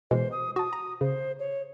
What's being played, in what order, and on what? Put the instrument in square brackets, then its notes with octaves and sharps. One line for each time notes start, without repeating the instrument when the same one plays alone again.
[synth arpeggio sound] B2 E3 G#3 [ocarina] C5
[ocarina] D#6
[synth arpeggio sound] F#4 A5 [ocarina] D#6
[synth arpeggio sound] A#5
[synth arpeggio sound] C#3 [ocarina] C5
[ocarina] C#5